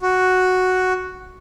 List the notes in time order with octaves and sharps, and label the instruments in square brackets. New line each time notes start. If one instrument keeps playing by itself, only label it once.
[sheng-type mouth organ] F#4